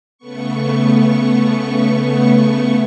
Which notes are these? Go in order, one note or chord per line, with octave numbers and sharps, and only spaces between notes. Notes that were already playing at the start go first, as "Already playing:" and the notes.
C#3 A3 B3 C#6